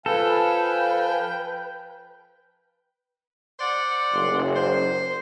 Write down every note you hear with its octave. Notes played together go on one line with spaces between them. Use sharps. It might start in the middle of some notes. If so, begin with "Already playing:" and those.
F3 A4 B4 F5 G5 G#5
C5 D5 F#5
F#1
C5